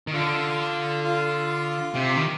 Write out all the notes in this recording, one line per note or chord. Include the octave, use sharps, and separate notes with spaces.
D#3
D3 F4
F4
C3 G4
D#3